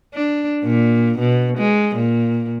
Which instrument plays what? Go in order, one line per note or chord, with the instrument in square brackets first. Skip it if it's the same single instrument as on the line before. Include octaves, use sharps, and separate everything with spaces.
[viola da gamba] D4
A#2
B2
G#3
A#2